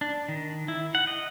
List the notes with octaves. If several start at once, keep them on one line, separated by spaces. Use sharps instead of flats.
D4
D#3
E4
F#5
D#5